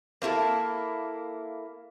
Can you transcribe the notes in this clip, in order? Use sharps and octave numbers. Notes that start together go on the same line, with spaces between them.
A#3 E4 F#4 A4